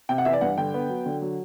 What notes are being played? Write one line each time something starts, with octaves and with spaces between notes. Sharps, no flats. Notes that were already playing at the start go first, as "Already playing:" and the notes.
C3 G5
F#5
E3 E5
D5
G2 F#5
D3 G5
B3
F#3
D3
F#3